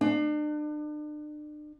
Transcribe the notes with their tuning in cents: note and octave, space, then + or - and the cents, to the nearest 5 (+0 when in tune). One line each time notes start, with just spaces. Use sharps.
D4 +40